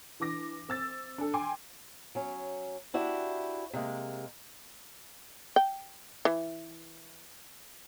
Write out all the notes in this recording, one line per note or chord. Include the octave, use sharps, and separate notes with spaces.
E3 D4 D6 A#6
C4 E6 A6
D4 A4
G5 G#5 C6 D6
F#3 C#4
D4 E4 F#4 G4
C3 G#3 A#3
G5
E3